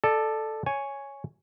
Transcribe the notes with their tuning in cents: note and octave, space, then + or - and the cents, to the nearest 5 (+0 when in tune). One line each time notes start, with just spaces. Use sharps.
A4 +0 D5 +30
C#5 +0 G#5 +0